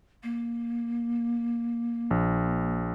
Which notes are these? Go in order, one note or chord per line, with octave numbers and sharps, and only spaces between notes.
A#3
A#1